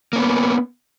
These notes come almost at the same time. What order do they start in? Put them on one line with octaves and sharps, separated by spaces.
A#3 C#4 B3